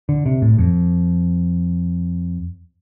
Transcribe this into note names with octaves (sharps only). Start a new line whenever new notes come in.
D3
C3
A2
F2